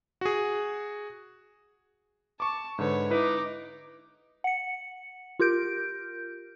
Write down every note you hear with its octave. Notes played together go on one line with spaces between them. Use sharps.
F#4 G#4
A5 C#6 D6
G#2 D3 B4 C#5
D#4 E4 B4 D6
F#5 C#7
F4 G4 A#4 G6 D7